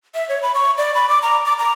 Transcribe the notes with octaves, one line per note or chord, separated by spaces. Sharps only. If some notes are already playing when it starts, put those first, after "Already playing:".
E5
C#5
B5
C#6
D5
B5
D6
A#5
D6
A#5